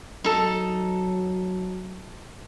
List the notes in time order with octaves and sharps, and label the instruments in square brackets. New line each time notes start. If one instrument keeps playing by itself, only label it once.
[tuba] F#3 [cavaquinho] D#4 A4